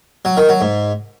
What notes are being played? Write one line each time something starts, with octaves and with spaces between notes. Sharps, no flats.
F#3
D#3
F#3
G#2